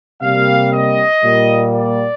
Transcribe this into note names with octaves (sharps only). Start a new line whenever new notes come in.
C3 G3 A#3 F5
D#5
A#2 G3 A#3
D5